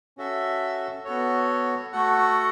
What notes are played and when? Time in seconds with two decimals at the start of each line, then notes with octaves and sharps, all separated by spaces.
0.17 C#4 F#4 A4 E5
1.05 B3 F#4 A4 C#5
1.93 A3 F#4 A4 F#5